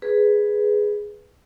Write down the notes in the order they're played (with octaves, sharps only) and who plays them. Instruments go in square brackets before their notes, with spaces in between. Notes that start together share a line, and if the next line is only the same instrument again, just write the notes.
[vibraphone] G#4 B4